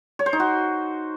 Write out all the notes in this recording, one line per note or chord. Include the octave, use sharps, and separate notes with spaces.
C#5
C5
D#4
F#4